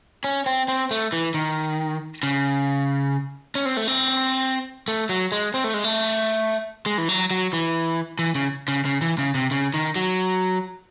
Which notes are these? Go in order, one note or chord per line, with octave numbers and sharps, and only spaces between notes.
C#4
C4
C4
A3
E3
D#3
C#3
C#4
C4
A3
C4
A3
F#3
G#3
C4
A3
G#3
A3
G#3
E3
F#3
F#3
E3
E3
C#3
C#3
C#3
E3
C#3
C3
C#3
D#3
F#3